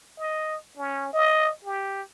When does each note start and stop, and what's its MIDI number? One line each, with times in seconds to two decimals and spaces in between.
0.19 0.56 75
0.77 1.13 61
1.13 1.51 75
1.64 2.01 67